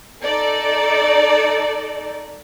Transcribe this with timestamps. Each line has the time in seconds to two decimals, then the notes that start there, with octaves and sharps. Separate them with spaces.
0.23 D#4 A4 D5